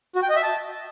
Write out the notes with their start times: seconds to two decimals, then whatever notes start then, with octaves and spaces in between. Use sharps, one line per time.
0.16 F#4
0.22 G5
0.29 D#5
0.36 E5
0.43 A5